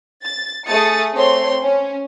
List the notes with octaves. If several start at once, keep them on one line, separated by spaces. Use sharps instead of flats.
A6
A3 G#4 D#6 A6 C#7
A3 C4 C#5 C6
C#4